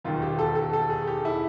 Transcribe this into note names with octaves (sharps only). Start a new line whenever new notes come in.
E1 D#2 D#3 F4
G4
A4
A4
A4
G#4
G4
E4